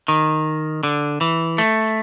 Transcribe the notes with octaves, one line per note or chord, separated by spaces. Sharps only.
D#3
D3
E3
A3